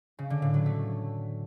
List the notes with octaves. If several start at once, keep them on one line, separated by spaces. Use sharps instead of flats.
C#3
D3
A2
F#3
A3